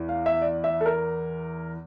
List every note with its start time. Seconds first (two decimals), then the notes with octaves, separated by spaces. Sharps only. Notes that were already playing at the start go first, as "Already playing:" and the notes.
Already playing: E2 E3
0.09 F5
0.26 E5
0.41 D5
0.64 E5
0.81 A4
0.86 A#4